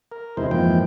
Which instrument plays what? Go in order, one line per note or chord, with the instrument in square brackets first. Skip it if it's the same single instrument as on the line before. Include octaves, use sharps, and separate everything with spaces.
[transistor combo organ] A#4
E2 C3 D#3 G#3 E4 C5
F2 G#2 E3 F3 A#3 G5